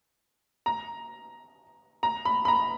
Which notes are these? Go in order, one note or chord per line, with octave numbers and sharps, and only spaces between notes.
A#5
A#5
B5
B5
A#5